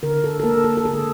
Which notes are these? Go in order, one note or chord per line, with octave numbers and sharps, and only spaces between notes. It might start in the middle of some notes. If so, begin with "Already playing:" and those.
D3 A#4
A4
A4
A#3 A#4
A4
A4
D3 G#4